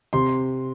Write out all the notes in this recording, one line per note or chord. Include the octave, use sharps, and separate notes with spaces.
C3 C6